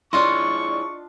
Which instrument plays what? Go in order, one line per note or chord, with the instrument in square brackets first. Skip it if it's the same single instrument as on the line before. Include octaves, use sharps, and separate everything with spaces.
[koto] D4 F4 D#5 [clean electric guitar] E4 G#4 C#5 [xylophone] C6 [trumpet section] C#6